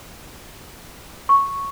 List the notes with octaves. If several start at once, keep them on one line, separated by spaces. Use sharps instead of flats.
C#6